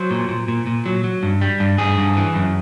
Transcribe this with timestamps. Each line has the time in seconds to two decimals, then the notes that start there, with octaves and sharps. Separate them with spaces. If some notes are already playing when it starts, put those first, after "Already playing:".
Already playing: F#3 C5
0.11 A#2
0.29 A#2
0.48 A#2
0.67 A#2
0.86 F#3
1.04 F#3
1.23 G2
1.41 G3
1.60 G2
1.78 G2 G#4
1.98 G2
2.17 E3
2.35 F#2